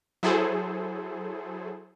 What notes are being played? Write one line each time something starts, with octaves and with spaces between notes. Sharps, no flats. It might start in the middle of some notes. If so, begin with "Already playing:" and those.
F#3 E4 G#4 A4 C5